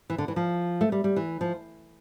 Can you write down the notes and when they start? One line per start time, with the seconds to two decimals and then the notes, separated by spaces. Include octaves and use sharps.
0.10 E3
0.18 D3
0.28 E3
0.36 F3
0.81 A3
0.92 G3
1.04 G3
1.16 E3
1.41 F3